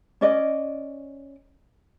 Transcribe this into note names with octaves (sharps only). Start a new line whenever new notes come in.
C#4 D5 D#5